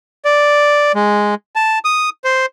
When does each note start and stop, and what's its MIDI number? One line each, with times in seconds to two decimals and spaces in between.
0.25 0.92 74
0.95 1.35 56
1.56 1.79 81
1.85 2.10 87
2.24 2.46 72